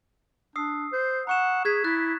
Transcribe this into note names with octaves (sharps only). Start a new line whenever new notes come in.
D4 D#6 E6 C7
C5
F#5 A#5 C#6 E7
G#4 F#6 G#6 B6
E4 F#6 A6